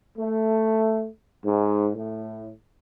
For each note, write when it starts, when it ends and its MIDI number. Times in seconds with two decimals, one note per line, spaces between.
0.18 1.08 57
1.45 1.89 44
1.95 2.49 45